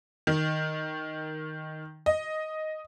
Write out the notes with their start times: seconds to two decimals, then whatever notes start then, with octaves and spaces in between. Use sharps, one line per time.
0.27 D#3
2.06 D#5